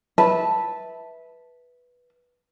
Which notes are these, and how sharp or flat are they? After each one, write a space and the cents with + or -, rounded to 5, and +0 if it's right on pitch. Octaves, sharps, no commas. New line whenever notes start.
B4 -5 E5 -15 A5 +0